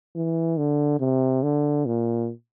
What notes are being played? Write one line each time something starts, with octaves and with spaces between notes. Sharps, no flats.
E3
D3
C3
D3
A#2